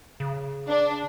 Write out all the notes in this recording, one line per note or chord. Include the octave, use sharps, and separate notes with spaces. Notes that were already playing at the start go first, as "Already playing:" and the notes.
C#3
D4